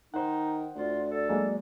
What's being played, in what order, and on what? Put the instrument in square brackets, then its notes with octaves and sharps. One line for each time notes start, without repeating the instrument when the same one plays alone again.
[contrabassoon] D#3 [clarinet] D#4 [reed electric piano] C5 F#5
[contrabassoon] D2 [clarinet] F4 [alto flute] D5
[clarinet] A4 [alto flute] D5
[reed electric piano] F#3 G#3 A#3